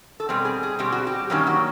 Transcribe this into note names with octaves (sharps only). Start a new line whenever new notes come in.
A4
B2 G3 C4 G#4
G#4
G#4
B2 G3 C4 G4
F#4
G4
G2 D#3 F#3 A#3 C#4 G4
F#4